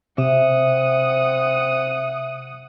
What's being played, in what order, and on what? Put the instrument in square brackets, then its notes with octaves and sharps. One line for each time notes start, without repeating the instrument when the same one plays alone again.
[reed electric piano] C3 [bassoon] C4 [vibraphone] E5 [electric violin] F#5 D#6